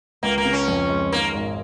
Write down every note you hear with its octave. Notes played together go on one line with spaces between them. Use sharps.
C#2 A#3
A#3
C#3
C#4
F2
G#3
D#3 A#3
G#1